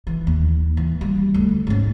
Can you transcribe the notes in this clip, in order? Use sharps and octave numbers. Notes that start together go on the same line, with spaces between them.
E3
D#2
E3
G3
D2
G#2 C#4